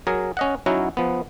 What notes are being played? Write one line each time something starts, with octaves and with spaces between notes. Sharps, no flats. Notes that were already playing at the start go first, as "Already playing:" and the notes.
F#3 G#4 A#4
C#4 D#5 F#5
F#3 C#4 D#4 E4 F#4
F3 B3